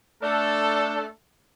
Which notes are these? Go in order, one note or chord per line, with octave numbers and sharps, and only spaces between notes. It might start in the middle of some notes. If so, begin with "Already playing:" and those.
A3 D4 A4